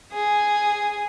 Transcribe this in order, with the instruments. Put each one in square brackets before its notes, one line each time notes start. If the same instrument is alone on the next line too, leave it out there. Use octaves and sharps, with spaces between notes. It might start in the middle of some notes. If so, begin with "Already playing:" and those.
[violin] G#4